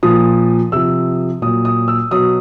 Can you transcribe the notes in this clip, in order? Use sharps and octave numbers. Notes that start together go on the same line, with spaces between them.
A#2 F3 D#6
C3 F3 E6
A#2 F#3 D#6
D#6
E6
B2 F#3 D#6